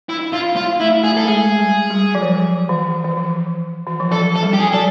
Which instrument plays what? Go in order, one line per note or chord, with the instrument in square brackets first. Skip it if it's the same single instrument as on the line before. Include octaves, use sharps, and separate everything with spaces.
[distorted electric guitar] E4
F4
F4
[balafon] A3 [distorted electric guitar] E4
[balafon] A3 [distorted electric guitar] G#4
[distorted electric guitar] A4
[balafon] G#3 [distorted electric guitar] G#4
[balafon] G3
G3
F#3
F3
E3
E3
F3
E3
F3
[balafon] F#3 [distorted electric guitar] A4
[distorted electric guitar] A4
[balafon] G3
[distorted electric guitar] G4
G#4
[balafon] F#3 [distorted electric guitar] A4